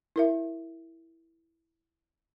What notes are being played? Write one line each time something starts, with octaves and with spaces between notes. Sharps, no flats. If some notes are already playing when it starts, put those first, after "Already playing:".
E4 A#4 E5